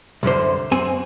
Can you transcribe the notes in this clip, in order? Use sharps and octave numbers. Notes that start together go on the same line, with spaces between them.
C2 F#2 D3 C5
F#2 C4 G#5